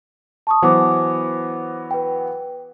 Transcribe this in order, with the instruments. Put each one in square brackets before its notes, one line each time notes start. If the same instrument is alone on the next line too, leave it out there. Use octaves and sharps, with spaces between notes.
[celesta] A5 C#6 D#6
[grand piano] E3 F#3 B3 [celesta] C5 D6
[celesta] B4 G5